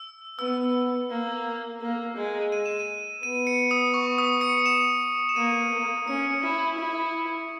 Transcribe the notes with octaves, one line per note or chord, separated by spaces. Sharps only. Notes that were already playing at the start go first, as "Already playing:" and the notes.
Already playing: E6
B3 E6
A#3
A#3
G#3
D#7
E7
D#7
B3 D#7
C#7
D#6
C#6
D#6
C#7
E7
E7
A#3 D#7
A#3
C#4 C#7
E4
E4